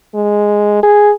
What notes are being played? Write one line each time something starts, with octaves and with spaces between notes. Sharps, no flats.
G#3
G#4